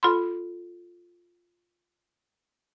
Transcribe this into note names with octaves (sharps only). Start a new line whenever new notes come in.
F4 A4 B5 C6